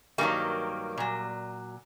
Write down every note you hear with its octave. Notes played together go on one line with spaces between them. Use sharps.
G2 D#3 F#3 G3 A#3
A#2 F#3